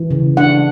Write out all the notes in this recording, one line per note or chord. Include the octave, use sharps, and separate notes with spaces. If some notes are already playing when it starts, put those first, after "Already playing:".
Already playing: E3
C#3
D4 F#5